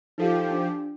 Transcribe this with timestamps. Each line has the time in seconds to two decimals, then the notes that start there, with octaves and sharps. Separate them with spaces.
0.18 F3 D#4 G4 A4 F5
0.51 D4